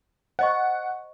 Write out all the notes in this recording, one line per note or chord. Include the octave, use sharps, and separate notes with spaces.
C5 D#5 F#5 C#6